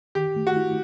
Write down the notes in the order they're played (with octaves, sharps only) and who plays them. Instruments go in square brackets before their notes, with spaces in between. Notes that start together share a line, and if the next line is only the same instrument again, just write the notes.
[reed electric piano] D#3 [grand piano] G4
[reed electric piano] A3
[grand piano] F#4
[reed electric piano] E4